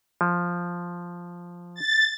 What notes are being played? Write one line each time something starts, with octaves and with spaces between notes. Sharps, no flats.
F3
A6